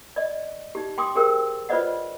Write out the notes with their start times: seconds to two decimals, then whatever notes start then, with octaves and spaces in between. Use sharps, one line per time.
0.16 D5 D#5
0.75 D#4 G4
0.98 G5 C6 D6 D#6
1.15 G4 G#4 A#4 C5 G5 E6
1.69 F4 B4 C5 D5 D#5 F#5